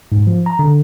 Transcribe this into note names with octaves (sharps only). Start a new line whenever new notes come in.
G#2
F3
A#5
D3